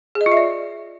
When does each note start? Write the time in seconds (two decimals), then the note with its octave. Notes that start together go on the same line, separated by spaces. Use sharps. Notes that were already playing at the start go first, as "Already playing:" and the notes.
0.15 G#4
0.21 D#5
0.26 F4
0.32 E5
0.37 D5